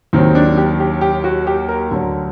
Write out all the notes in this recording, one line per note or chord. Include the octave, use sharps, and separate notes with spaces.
D#2 D#3 F#3 C4
D4
G4
G4
G4
F#4
G4
A#4
D2 D3 F#3